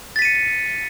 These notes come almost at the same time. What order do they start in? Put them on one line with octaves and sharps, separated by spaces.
A6 B6 D#7 C#7